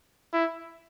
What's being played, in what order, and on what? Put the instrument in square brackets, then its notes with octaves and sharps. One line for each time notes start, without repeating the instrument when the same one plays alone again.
[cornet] E4